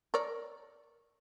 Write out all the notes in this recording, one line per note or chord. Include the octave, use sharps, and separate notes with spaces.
A#4 C#5 D5